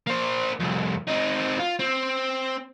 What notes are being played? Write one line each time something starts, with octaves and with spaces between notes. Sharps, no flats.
A#3 C5
C2 F2
C4 D#4
F4
C4